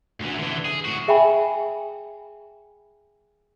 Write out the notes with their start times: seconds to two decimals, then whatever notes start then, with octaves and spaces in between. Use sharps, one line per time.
0.20 D2 E3
0.39 D3 E3
0.65 G#4
0.85 A2 F#4
1.08 G#4 E5 G5 G#5 B5